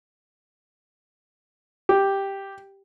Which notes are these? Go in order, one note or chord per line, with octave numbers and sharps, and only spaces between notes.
G4